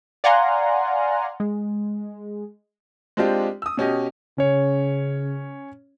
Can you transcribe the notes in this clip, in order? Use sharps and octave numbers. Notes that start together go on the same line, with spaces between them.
D5 F5 F#5 G#5 A#5 C6
G#3
G#3 C4 D4 F4 G4
D#6 E6
B2 C#4 G4 D#5
C#3 C#4 C#5